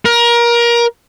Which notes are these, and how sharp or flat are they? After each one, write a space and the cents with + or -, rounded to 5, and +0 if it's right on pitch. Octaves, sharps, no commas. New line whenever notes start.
A#4 +25